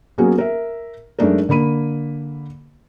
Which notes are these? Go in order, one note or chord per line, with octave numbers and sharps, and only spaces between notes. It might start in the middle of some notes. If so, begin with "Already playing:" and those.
F#3 A#3 B3 C#4 F#4 G#4
A#4 E5
F#2 G#3 A3 D4 D#4 A#4
D3 A#3 B5 D#7